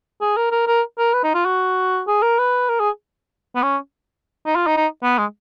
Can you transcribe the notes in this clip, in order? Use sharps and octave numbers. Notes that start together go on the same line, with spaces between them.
G#4
A#4
A#4
A#4
A#4
B4
D#4
F4
F#4
G#4
A#4
B4
A#4
G#4
B3
C#4
D#4
F4
D#4
D#4
B3
G#3